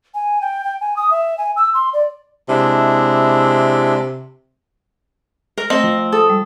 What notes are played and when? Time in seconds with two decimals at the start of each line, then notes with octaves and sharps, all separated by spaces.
0.14 G#5
0.41 G5
0.64 G5
0.80 G#5
0.96 D#6
1.11 E5
1.38 G#5
1.56 E6
1.74 C6
1.93 D5
2.49 C3 G#3 D4 E4
5.57 A#4
5.70 A3 C4 D#5
5.84 F3
6.13 A4 D#6
6.29 G3